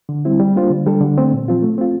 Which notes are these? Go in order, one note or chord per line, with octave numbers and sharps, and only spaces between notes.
D3
G3 C4 E4
G3
A#3 D4 F4 C5
D3
G3 D4 A4
D3
A3 C4
A#2
F3 C4 F4
A3
C4 F4